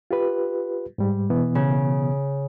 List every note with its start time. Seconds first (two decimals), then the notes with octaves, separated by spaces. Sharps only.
0.11 F4 G4 B4
0.98 G#2 G3
1.30 B2 E3 B3
1.55 C#3